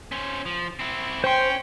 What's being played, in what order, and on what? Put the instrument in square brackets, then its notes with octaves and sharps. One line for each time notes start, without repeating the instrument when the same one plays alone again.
[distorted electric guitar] C#4 C5
F3
C4 E4
[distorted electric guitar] C#4 [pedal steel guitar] C5 C6 [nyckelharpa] G5